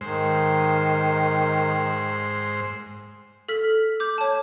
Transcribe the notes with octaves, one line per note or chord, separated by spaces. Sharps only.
G#2 D#3 C5
A4 F6 B6
D6 G6
C#5 A5